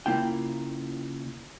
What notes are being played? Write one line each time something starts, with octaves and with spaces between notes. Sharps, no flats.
C#3 E3 A#3 E4 F4 G5